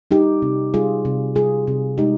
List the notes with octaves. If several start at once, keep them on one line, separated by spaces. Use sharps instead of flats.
G3 D#4 G4
C3
G3 F4 G#4
C3
G3 F4 G#4
C3
G#3 D#4 G4